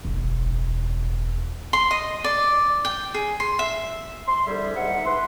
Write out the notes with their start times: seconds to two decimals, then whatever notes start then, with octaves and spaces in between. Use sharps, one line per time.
0.05 E1 A1
1.73 C6
1.91 D#5
2.24 D5
2.85 G5
3.14 G#4
3.40 C6
3.59 E5
4.27 C6
4.47 C2 D3 G3 G#4 E5
4.76 G#2 E5 F#5
5.06 E4 B4 C6